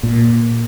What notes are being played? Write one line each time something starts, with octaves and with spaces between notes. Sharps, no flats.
A#2